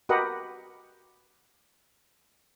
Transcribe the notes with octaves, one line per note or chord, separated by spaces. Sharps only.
F#4 G4 A#4 B4 D#5 F#5